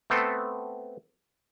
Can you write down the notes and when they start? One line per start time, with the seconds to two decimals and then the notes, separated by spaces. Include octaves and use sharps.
0.10 A3 B3 C4 A4